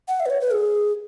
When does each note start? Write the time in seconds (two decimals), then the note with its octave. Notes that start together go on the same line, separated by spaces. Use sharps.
0.08 F#5
0.20 E5
0.26 B4
0.30 C#5
0.41 B4
0.52 G#4